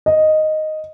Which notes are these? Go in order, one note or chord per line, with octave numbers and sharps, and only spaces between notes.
D#5